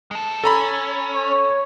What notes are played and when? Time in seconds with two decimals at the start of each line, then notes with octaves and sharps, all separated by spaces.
0.11 G#3 A4
0.44 C#4 A4 A#5 B5
1.15 C#5